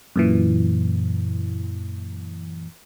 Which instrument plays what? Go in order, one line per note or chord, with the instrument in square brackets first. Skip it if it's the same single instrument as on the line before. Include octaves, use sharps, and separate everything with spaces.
[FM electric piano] F#2 A#2 E3